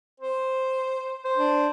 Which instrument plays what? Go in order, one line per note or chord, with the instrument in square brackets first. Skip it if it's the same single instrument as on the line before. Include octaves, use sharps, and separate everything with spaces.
[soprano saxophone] C5
[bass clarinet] C5
[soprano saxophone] D4